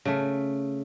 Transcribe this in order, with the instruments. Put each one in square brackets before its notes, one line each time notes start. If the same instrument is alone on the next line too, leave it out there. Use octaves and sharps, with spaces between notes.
[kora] C#3 A3